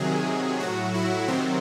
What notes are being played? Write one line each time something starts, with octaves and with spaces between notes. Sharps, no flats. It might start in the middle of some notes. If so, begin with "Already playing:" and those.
Already playing: C3 D#3 F#3 G#4
A2 F#3 F#4
E4
C3 D#3 F#3 C4